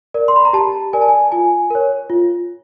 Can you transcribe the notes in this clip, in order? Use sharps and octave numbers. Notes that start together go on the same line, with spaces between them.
A#4 D5
C6
B5
A#5
G4 A5
A#4 D5 G#5
A5
G#5
F4 G#5
A#4 C#5
F4